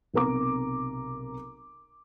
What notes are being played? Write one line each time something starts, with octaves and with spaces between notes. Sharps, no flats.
B1 C3 A#4 A#5 D6